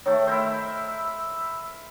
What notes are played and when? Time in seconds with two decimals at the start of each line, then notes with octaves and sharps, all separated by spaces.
0.06 D#3 A3 C#5
0.27 E4 A#4 C5 E6